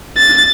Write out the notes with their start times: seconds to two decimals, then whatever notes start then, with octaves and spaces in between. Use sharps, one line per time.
0.17 A6